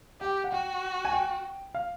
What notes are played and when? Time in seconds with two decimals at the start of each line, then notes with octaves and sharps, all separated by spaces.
0.21 G4 G5
0.44 F#5
0.52 F#4 G5
1.05 G#5
1.13 G5
1.75 F5